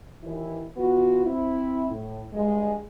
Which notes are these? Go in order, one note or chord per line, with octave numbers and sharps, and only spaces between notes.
D#2 E3 E4
B2 E3 B3 F4 F#4
C4 E4
A2
G2 G#3